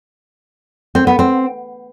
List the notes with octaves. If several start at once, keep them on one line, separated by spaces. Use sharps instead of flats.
C4
B3
C4